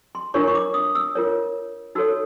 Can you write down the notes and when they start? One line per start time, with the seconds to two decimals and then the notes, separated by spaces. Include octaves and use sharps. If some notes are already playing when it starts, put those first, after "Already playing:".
0.15 C6
0.34 D4 F4 A#4 C#5 C#6
0.47 C#6
0.55 D6
0.74 D#6
0.95 E6
1.15 F4 A#4 C#5
1.95 D#4 F#4 A4 C#5 E6